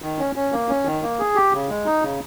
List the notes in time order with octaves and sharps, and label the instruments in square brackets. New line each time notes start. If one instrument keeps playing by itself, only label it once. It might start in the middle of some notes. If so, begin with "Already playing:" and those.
[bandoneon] D#3
C#4
C#4
A#3
C#4
D#3
A#3
G#4
G4
C#3
G#3
D#4
C#3